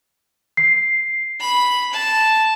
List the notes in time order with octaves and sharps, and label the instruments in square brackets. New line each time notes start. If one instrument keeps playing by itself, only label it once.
[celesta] C7
[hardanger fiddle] B5
A5